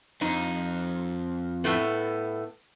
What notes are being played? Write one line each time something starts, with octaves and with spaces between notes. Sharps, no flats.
F2 D#4
A2 A3 B3